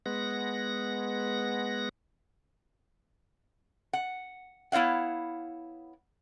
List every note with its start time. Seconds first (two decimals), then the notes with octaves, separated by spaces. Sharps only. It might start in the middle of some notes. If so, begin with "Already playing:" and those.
0.06 G#3 B3 F#5 A#6
3.93 F#5
4.72 B3 E4 C#5 F5 F#5